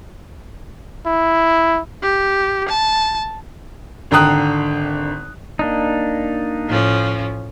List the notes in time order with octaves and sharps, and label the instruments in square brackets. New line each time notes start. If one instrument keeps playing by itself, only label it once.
[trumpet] E4
[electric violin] G4
A5
[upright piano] G#1 D3 G5 A#5 D#6 F#6
[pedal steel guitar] A#3 D4 D#4
[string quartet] A2 F3 C#4